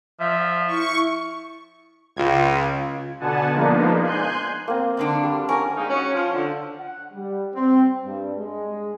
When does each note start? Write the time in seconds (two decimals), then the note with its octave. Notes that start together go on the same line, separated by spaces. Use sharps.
0.20 F3 E5
0.67 E4 C#6
2.17 C#2 C#3 F4 G#6
3.20 B2 D3 B3 F#5 G#5 A5
3.53 F3 G#3 A#3 B3 D4 D#4
4.02 G#5 C6 F#6 G6
4.68 A#3 C4
4.97 F#2 D3 D4
5.23 G3
5.49 C#4 A#4 F#5 G#5
5.77 G3 G#3 A#3 D#4
5.89 C#4 F#4
6.14 F3
6.33 D3
6.80 F#5
7.12 G3
7.53 C4
8.04 G2
8.37 G#3